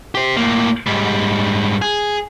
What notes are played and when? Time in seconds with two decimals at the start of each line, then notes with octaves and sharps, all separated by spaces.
0.15 G4 C5
0.36 A2 A#3
0.87 G#2 G3
1.82 G#4